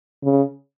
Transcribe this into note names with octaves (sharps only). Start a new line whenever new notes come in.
C#3